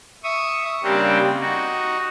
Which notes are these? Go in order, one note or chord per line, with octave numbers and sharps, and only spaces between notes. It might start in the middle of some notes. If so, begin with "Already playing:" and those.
E5 C#6 D#6
C#3 G3 A#3 C4 D4 G4
D#4 F#4